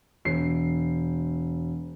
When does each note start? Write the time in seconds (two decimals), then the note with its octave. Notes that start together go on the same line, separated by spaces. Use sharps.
0.25 E1 C7